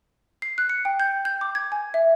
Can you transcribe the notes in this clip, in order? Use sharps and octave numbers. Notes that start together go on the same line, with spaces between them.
C7
F#6
C#7
G5
G6
G6
D6
G#6
G#5
E5